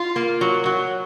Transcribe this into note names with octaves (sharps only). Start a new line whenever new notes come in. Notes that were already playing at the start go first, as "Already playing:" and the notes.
Already playing: F4
A#3
F#3
F#3